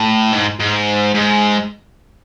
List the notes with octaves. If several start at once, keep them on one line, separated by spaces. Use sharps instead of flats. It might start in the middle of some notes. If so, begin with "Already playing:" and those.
Already playing: A2
G#2
G#2
G#2